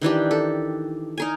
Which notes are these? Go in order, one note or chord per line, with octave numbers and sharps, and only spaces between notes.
D#3 E3 D4 G4
A4
D#4 A#4 G#5